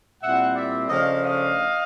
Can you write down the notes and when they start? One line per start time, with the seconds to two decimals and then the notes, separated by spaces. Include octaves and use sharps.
0.22 A#2 G3 C4 E4 E5 F#5
0.56 D5 E5
0.90 C#3 F3 A3 D4 D#5 F5
1.24 D#5 F5